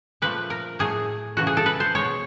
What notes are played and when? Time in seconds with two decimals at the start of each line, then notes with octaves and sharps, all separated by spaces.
0.22 A#2 F3 A3 B4
0.50 A#4
0.79 A2 F#3 A3 G#4
1.37 C#3 E3 A3 F#4
1.47 G#4
1.57 A4
1.66 B4
1.80 C5
1.95 B2 G#3 C#5